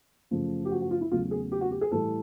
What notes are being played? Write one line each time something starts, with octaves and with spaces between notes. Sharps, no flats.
F#2 C#3 F3 A3
G4
F#4
F#4
F4
E4
E2 C#3 F#3 A3 F4
G#4
G4
F#4
G4
G#4
A2 E3 G3 A4